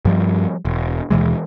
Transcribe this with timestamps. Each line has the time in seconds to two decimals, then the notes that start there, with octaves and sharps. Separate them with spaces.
0.05 G2 F3 G3
0.65 E1
1.10 D#2 B2 E3 G#3